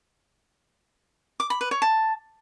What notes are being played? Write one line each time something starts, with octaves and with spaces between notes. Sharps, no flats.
D6
B5
B4
C#5
A5